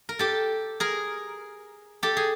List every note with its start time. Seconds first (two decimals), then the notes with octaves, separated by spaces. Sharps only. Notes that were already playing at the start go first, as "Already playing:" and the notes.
0.09 A#4
0.19 G4 A4
0.80 G#4 A#4
2.03 G4 A4
2.17 G#4